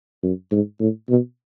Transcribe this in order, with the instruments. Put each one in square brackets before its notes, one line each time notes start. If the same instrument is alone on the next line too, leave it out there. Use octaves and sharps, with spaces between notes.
[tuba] F#2
G#2
A2
B2